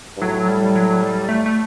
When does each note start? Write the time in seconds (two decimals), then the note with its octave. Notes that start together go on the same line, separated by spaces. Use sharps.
0.17 G2
0.21 A2 F#3
0.48 G3
0.75 F#3
1.01 G3
1.29 A3
1.46 A3